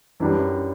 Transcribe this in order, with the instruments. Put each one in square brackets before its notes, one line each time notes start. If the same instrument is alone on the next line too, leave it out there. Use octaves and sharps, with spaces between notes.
[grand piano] F#2 E3 G3 D4